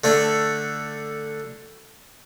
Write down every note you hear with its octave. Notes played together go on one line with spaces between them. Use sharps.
D3 A3 D4